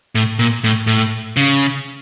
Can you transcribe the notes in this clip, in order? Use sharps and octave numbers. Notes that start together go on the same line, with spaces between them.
A2
A#2
A2
A2
C#3